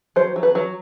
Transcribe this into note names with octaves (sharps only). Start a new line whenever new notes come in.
F#3 C5
F#3
B4
F#3